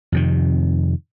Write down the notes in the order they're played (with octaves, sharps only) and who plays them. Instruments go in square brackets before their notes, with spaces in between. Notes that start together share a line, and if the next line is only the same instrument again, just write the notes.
[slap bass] F2 C3 D#3